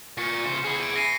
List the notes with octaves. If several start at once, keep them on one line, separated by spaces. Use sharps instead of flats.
A#2 C#6 C#7
C#3 C5
E4 G#4
D7
A#6 C7 D#7